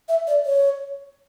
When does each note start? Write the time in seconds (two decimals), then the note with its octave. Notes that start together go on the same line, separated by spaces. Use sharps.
0.09 E5
0.27 D5
0.46 C#5